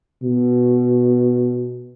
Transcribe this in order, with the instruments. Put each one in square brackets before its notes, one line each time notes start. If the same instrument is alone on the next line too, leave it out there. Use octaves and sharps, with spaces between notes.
[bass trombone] B2